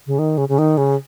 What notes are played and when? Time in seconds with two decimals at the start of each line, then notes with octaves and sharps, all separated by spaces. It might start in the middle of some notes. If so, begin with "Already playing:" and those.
0.07 C#3
0.19 D#3
0.38 C#3
0.49 C#3
0.58 D#3
0.78 C#3